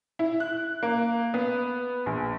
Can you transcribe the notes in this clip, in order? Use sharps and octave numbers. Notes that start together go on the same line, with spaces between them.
E4
F#6
A#3
B3
A#1